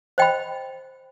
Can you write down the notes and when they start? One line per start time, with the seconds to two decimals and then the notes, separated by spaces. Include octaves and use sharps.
0.18 C5 D#5 G5 B5